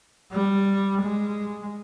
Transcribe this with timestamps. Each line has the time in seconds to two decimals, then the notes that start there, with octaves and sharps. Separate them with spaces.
0.32 G3
1.02 G#3